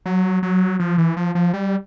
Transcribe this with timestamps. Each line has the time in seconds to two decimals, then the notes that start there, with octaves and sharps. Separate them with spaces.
0.06 F#3
0.43 F#3
0.79 F3
0.98 E3
1.17 F3
1.35 F3
1.54 G3